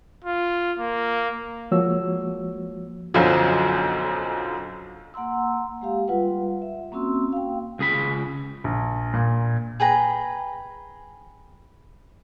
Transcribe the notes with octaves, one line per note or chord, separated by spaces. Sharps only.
F4
A#3
F3 G#3 A#3 F#4 C#5 E6
B1 F#2 D3 F3 F#3
A#3 F#5 A#5 C6 E6
G#3 G4 F5
G3 F4 B4 F#5
E5
A#3 C4 C#4 F#4 C6 E6
F5 G5
C#2 G#4 B5
A#1
A#2
G#4 B4 G5 A#5